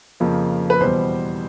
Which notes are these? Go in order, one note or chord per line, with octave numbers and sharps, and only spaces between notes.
F2 C#3 F3 A#3
B4
E2 B2 G3 C5